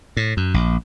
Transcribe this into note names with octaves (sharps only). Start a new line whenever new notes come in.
A2
F#2
A#1